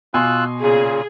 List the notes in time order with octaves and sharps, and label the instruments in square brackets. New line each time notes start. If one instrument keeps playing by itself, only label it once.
[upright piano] B2 G#5 C6 [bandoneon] F4 E6 F#6
[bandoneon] A#2 C#3 [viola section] G#4